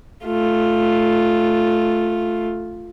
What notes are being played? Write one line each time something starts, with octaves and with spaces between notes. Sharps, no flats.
A3 F4